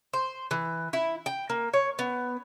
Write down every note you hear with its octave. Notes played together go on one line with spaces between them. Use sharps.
C5
E3
E4
G5
A#3
C#5
B3